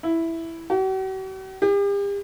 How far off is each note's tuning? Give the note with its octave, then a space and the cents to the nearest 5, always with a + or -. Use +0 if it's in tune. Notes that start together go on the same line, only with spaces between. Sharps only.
E4 +0
F#4 +45
G4 +40